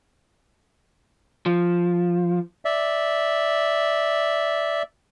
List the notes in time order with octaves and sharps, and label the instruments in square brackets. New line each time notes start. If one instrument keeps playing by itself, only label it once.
[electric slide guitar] F3
[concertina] D5 E5